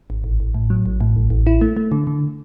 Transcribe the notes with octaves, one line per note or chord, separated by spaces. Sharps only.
G#1
A1
A1
A2
F#3
A1
A2
A1
A1
E4
A3
A3
D3
D3